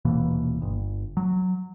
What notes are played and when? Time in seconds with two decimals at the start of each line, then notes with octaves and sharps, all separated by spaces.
0.05 D#1 B2 E3 A#3
0.62 G1
1.17 F#3